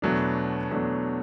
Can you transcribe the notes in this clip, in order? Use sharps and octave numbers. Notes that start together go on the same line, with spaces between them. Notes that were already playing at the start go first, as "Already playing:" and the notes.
E2 B2 F#3 A3 D4
E2 B2 F#3 A3 D4